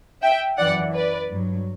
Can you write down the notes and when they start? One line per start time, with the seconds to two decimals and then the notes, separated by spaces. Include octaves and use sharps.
0.22 E5 G5
0.58 F#2 E3 D5 F#5
0.94 B4 D5
1.30 G2 F#3